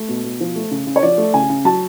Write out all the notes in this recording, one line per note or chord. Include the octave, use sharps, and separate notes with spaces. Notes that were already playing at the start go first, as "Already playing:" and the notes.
Already playing: A3
B2
B2
F3
A3
C#3
C#3
C#5
F3 D5
A3
C#3 G#5
C#3
F#3 A5